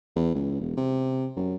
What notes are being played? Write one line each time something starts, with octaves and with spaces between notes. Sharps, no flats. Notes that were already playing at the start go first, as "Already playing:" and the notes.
E2
C#2
E1
C3
F#2